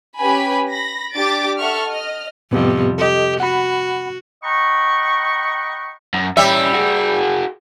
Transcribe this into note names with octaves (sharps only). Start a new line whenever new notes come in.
C#4 G4 B4 G#5 B5
B5 A#6
D4 G4 D6 A6 D7
A4 E5 F#5 C#6 F6
D#5 F6
F2 A2 C3 G3 B3 G4
G4 A4 D#5
F#4 F#5 B5
D#5 F#5 G5 A#5 B5 C#6
F#2
G3 C#4 G4 E5
F#4 G#4